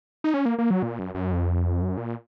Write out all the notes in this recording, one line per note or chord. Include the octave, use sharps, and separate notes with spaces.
D#4
C#4
A#3
A#3
F#3
A#2
F#2
F#2
F2
F#2
A#2